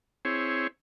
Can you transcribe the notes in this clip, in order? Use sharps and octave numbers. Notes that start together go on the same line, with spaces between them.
C4 E4 G#4 C#5